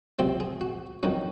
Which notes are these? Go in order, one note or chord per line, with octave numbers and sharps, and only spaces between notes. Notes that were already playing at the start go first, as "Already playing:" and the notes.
C#2 C3 F#3 C4 C5
G#4
F#4
F2 D#3 F#3 C#4 F#4